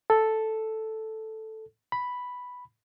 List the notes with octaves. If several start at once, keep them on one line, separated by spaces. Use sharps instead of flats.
A4
B5